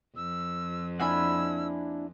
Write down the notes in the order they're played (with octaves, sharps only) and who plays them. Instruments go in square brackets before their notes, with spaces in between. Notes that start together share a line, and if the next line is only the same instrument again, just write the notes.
[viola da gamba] F2 [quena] E6
[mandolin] A#3 G#5 B5 [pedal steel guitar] D4 E4 F#5 [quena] E6